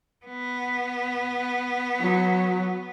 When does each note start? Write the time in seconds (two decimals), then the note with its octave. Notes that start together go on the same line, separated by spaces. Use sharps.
0.25 B3
2.01 F#3